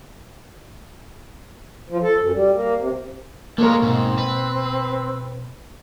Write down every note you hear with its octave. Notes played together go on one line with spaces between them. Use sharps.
F3
A4
F#2
G3
A#3
C3
D3 G#3 A#3 A#4 C#5
G#2 B2 C4
B4